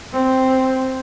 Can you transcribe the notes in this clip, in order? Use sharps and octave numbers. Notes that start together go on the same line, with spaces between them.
C4